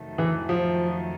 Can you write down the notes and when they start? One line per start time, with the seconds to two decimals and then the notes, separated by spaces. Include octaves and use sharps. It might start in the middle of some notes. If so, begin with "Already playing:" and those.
Already playing: F2 C3 D#3 F#3 A3
0.18 E3
0.49 F3